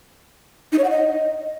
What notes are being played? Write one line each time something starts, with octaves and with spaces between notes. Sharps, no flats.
D#4
C#5
F#5
D#5